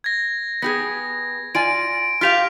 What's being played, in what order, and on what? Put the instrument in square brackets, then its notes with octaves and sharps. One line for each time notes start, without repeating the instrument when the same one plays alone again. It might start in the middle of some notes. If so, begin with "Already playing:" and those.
[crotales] G#6 A#6
[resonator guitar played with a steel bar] B3 G4 G#4 [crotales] A#6
[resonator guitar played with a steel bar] F4 D5 G#5 [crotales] D7
[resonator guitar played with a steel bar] F4 G4 F5 [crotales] F6 B6 F7